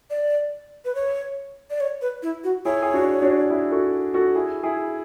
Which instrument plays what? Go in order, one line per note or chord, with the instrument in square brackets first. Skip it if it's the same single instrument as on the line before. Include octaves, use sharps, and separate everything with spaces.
[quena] D5
B4
C#5
D5
C#5
B4
E4
F#4
[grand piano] E4 G#4 [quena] C#5
[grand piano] G#4
D4 F#4
D4 F#4
E4 G#4
F#4 A4
F#4 A4
E4 G#4
E4 G#4